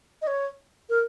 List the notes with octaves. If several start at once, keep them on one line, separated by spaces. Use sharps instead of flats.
D#5
C#5
A#4